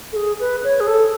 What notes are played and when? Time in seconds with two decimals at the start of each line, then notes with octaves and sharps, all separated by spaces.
0.13 A4
0.16 G#4
0.40 B4
0.64 C#5
0.80 G#4
0.87 A4